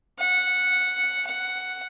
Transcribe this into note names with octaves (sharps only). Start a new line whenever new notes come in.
F#5
F#5